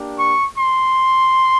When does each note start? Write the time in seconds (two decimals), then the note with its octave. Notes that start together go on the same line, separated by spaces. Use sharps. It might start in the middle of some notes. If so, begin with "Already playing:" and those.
Already playing: A#3 D4 G4
0.19 C#6
0.58 C6